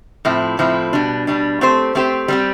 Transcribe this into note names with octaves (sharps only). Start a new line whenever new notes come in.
A2 F3 C4 E4
A2 F3 C4 E4
B2 G3 D4
B2 G3 D4
A3 C4 G4 C5
A3 C4 G4 C5
G3 C4 G4